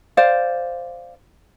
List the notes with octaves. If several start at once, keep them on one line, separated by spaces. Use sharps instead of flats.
C5 D5 F5